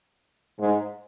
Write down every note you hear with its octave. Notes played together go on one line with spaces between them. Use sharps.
G#2